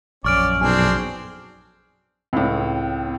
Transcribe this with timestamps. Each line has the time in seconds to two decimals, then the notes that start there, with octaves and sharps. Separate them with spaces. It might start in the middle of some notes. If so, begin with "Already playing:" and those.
0.24 A#1 F#2 C#4 D5 C#6 F6 D7
0.61 B1 C4 D4 G#4 G#5
2.33 C#2 A2 C4